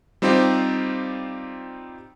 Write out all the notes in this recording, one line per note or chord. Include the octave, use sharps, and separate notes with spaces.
G3 C4 D#4 F4 G4 C5